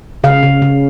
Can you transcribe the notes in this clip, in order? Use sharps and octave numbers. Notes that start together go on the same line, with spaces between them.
C#3 F5
C#3
C#3